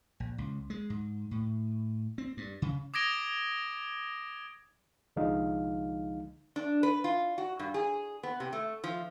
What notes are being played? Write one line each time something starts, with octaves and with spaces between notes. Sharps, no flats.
A#1
C#2
G#3
G#2
A2
C4
G2
C#3
D6 D#6 G#6 A#6 D7 G7
C2 D3 F3 G#3 D#4 F5
D4
B4
F4
F#4
G2
G#4
B3
C3
A3
F3